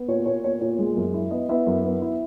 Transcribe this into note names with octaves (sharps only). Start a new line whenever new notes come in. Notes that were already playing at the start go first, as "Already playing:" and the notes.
Already playing: B3
A#2 C#5
A#2 C#5
B3 C#5
A#2 C#5
G#3
F#2
E4
B3 D#5
B3 E4 E5
F#2
B3
E4